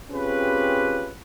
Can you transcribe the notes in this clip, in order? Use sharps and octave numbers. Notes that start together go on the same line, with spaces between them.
C4 C#4 F4 G4 G#4 B4